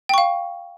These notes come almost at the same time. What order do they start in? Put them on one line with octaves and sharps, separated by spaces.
G5 C#6 F5